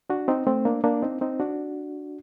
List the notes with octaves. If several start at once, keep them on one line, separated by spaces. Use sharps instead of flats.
D4 F#4
C4 D#4
A3 C4
A#3 D4
A#3 D4
C4 D#4
C4 D#4
D4 F#4